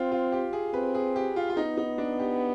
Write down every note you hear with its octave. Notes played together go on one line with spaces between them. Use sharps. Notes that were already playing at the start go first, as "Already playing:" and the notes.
Already playing: C4 F4
F4
G4
G#4
C4 B4
G#4
G4
F4
F4
B3 D#4
D#4
D4
G4